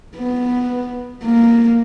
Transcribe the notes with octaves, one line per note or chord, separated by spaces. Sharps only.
B3
A#3